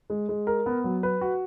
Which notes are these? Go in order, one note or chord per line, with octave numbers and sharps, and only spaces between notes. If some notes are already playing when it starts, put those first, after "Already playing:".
G#3
G#3
A#4
B3
F#3
B4
F#4